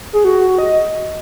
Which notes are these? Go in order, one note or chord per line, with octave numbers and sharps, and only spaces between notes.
G#4
F#4
F#4
F#4
D#5